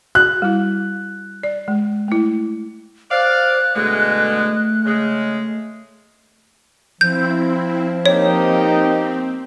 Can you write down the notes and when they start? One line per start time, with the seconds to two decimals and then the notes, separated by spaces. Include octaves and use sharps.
0.15 F#4 F#6
0.42 G3 E4
1.43 D5
1.68 G#3
2.08 A3 E4
3.11 C5 D5 F5 F#6
3.75 B2 D3 G#3 A3
4.85 C#3 G#3
7.01 F3 C4 E4 G6
8.06 A#3 C4 D#4 G4 C#5